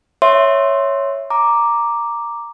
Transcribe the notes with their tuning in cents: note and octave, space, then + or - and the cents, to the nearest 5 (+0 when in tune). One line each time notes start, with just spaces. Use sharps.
C#5 +0 E5 +0 C6 +10
A#5 +0 D6 +0